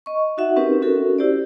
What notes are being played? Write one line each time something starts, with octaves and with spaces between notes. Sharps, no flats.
D#5 C#6
D#4 F#4 E5 F#5
C4 C#4 D#4 G4 A#4 B4
C#4 F#4 A4 A#4
E4 G4 C5 D5